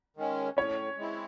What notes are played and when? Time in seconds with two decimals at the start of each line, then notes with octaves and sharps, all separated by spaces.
0.17 D#3 G#3 C#4
0.57 A2 C#4 C#5
0.98 G#3 C4 E4